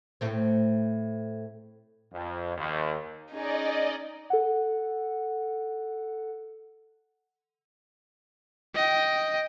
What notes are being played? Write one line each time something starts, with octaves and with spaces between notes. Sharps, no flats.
A2 A3 C4
F2
D#2
C#4 D#4 G#4 D5 D#5
A4 F#5
D#5 G5